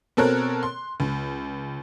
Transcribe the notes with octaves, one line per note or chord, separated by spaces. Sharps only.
B2 C4 A4 A#4 C#5 F#6
C6
C#2